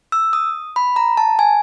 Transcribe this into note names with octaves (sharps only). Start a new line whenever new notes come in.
E6
D#6
B5
A#5
A5
G#5